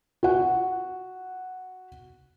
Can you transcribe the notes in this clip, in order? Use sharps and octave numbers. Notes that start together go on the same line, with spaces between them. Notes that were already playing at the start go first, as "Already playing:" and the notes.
F#4 F#5